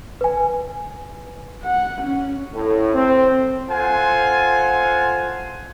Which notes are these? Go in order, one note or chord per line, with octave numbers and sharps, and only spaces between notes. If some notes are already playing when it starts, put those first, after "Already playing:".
B4 G#5
F#5
C#4
A2
C4
F4 A4 C5 F#5 G#5